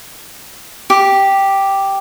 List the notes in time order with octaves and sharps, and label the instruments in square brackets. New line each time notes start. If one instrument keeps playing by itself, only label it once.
[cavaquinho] G4